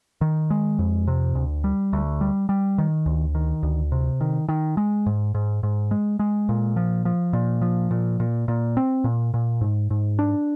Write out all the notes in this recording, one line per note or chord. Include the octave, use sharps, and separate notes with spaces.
D#3
G#3
F2
C3
D2
G3
D2
G3
G3
D#3
D2
D#3
D2
C3
D#3
D#3
G#3
G#2
G#2
G#2
G#3
G#3
A#2
F3
F3
A#2
F3
A#2
A#2
A#2
C4
A#2
A#2
G#2
G#2
D4